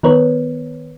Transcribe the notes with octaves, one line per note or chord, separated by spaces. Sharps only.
D#3 B3 A#4 B4 C#5